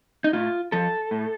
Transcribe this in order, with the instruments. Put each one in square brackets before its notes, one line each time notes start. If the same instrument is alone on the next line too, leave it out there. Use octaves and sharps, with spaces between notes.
[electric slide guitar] D#4
A2 F4
F3 A4
A2